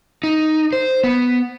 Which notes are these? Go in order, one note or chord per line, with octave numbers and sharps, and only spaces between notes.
D#4
C5
B3